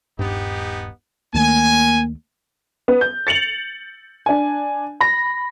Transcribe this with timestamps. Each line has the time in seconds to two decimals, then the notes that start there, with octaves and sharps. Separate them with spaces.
0.19 D#1 G2 B3 D#4 G4
1.34 D2 D#3 A3 A#3 G#5
2.88 B3
3.01 G6
3.27 A6 C#7 F7 F#7
4.26 D4 G#5
5.00 B5 A#6